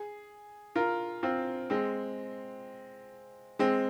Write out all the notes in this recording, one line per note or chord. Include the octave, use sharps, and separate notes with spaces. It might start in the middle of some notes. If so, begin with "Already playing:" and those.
Already playing: G#4
F4 A#4
C4 F4
G#3 C4
G#3 C4